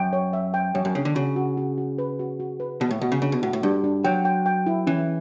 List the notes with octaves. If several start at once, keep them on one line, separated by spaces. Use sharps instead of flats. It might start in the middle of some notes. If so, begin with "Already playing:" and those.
Already playing: F#2 G5
C#5
E5
G5
F#2 C#5
F#2
C#3 D4
D3
C#3 F#4
F#4
F#4
F#4
B4
F#4
F#4
B4
B2 A5
A2
B2 F#4
C#3
C#3 D4
B2
A2 F#4
A2
G2 D4
D4
F#3 G5
G5
G5
E4
E3 C#4